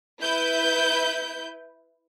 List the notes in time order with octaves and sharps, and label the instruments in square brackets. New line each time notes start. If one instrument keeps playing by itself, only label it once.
[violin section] E4 B4 G6